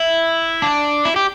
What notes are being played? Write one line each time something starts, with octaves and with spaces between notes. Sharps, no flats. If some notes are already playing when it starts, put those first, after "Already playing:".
Already playing: E4
D4
E4
G4